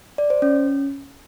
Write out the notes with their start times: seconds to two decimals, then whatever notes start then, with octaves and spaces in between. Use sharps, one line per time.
0.18 D5
0.30 C5
0.42 C#4